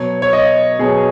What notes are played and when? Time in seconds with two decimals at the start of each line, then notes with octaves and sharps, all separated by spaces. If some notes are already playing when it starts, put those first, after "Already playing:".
Already playing: B2 F#3 C#5
0.22 C#5
0.33 D#5
0.79 B2 F#3 G#4